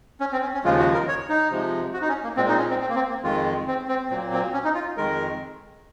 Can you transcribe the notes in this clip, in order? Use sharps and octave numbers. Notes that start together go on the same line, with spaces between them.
C#4
C4
C#4
C#4
D#2 C#3 F3 G#3 F4
F#4
A#4
C#5
D#4
C3 F3 G#3
F#4
D#4
C#4
A#3
A#2 G#3 C4
D#4
C#4
C4
C4
A#3
C4
A#3
F2 D#3 G#3 F4
C4
C4
A#2 F#3 A#3 C4
C4
C#4
D#4
F4
F2 D#3 G#3 A#4